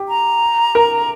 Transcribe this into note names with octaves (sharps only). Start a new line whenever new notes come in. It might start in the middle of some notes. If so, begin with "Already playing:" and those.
Already playing: G4
A#5
A#4